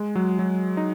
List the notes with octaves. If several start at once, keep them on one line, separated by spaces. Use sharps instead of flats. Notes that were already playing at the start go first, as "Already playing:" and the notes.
Already playing: G#3
F#3
F#3
D#4